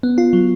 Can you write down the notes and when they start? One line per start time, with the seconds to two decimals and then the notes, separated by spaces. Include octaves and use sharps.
0.03 B3
0.18 F4
0.33 F#3